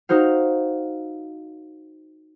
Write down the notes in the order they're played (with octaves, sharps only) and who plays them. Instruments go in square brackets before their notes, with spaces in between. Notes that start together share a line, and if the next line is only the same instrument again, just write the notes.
[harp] D#4 F#4 C5 F5